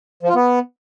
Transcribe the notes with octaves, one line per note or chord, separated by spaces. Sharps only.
F3
F4
B3